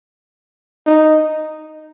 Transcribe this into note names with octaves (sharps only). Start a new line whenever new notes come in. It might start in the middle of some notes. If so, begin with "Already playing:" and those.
D#4